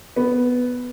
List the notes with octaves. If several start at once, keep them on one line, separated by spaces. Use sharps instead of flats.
B3